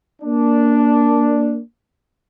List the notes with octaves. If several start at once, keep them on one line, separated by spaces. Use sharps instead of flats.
A#3 D4